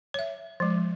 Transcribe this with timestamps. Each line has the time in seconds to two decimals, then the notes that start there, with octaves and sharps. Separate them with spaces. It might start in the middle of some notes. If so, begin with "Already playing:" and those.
0.14 C#5 E5
0.60 F3 G#3